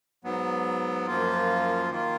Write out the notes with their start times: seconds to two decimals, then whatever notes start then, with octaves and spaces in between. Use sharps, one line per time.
0.24 G#2 F#3 B3
1.07 F#2 F3 A#3 F4
1.90 D#3 A#3 F4